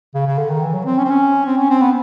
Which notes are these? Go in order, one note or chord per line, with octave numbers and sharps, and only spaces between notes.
C#3
C#3
D3
D#3
E3
F#3
C4
C#4
C4
C#4
C4
C#4
C4
B3